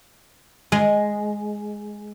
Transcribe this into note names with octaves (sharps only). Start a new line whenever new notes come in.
G#3